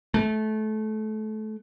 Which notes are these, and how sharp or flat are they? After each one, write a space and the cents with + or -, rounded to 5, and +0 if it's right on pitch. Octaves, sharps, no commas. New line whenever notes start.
A3 -25